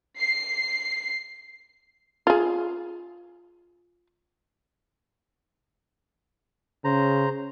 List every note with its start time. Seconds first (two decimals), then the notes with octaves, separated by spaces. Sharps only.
0.19 C7
2.27 F4 G#4
6.84 C#3 C5 A#5